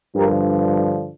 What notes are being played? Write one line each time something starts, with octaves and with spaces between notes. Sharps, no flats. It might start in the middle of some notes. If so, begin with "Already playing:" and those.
G2 D3 F3 G4 A#4